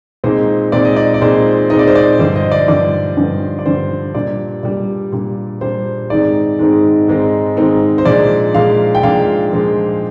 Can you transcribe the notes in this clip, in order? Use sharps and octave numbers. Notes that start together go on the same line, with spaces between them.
A#2 G#3 C4 D#4 C5
A#2 G#3 C4 D#4 D5
D#5
D5
D5
A#2 G#3 C4 D#4 C5
A#2 G#3 C4 D#4 D#5
D5
C5
D5
G2 D3 F3 C5
D#5
D5
G2 D3 F3 D5
G2 D3 F3
D5
G2 D3 F3 C5
A#2 G3 D4 D5
A#2 G3 D4 D5
A#2 G3 D4
A#2 G3 D4 C5
G#2 D#3 G#3 C4 D#4 D5
G#2 D#3 G#3 C4 D#4
G#2 D#3 G#3 C4 D#4
G#2 D#3 G#3 C4 D#4
C5
A#2 F3 G#3 D4 D5
A#2 F3 G#3 D4 F5
G5
A#2 F3 G#3 D4 F5
A#2 F3 G#3 D4